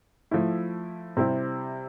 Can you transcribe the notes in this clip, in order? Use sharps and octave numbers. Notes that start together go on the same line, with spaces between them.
F3 A3 E4
C3 G3 C4 E4